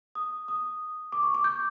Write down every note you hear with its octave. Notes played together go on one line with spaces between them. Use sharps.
D#6
D#6
D6
C#6
D6
G6